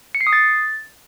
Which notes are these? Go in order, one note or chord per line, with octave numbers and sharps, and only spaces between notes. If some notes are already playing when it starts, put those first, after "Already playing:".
C#7
C7
D#6
A6